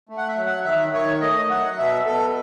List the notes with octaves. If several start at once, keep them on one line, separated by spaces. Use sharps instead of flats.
A3
F#5
E5
F#3
F#5
D#3 E5
D#3 C#5
A3 D#5
F#3 F#5
B2 E5
B2 A4